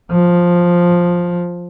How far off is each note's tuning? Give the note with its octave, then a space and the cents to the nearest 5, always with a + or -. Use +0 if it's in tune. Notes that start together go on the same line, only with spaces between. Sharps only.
F3 +5